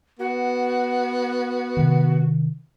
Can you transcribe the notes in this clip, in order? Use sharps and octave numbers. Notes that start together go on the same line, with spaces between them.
B3 F#4
C3 D#3